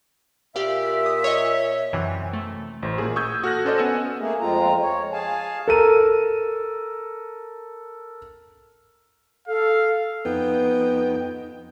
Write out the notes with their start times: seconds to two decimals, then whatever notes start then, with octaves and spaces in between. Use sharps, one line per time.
0.56 A#2 G4 D5 E5 F5
1.06 D#6
1.24 C#5 D#5
1.93 F#2 C3 E3
2.33 A3
2.82 A1 C5
2.98 A#2 A#3 G#4
3.16 C#6 D#6 E6 G6 G#6
3.43 F#4 A4 F6 F#6 A#6
3.65 C#4 A4 C5 D5 D#5
3.78 B3 F#5 G#5 E6 E7
4.19 A3 A#3 G#4
4.40 F2 G#3 C4 F4 A#5
4.82 C#5
5.12 G#4 F5 G#5 A5
5.68 A4 A#4 D#7
9.48 A4 F5
10.25 F2 B3 D#4 G5